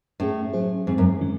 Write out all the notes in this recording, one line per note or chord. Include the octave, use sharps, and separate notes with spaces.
A2 A3 C#4 G#4
F#3 C#4 G#4 C5
G#2 D#3 G#3 C4
F#2
D#3 G#3 C#4